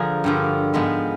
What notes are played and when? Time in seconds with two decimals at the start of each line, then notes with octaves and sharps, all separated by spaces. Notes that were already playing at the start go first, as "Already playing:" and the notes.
Already playing: D3 F3 G#4 A#4
0.24 G2 D3 F3
0.74 G#2 F3 G#3 B3